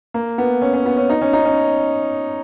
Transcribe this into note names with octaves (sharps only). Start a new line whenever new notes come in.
A#3
B3
C#4
C#4
B3
C#4
D#4
C#4
D#4
C#4